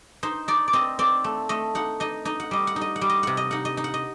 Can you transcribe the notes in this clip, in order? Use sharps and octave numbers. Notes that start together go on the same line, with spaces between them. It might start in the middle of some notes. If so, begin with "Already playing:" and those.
D#4 C5
D#4 D5
D5
C4 D#5
C4 D5
A3
A3 D#5
D#4 F#5
D#4 D#5
D#4 D#5
F#5
G3 D#5
F#5
D#4
D#5
F#5
G3
D#5
C3 F#5
D#5
D#4 F#5
D#5
D#4
F#5
D#5